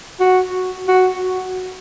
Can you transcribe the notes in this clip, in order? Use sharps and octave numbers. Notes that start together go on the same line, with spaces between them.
F#4
F#4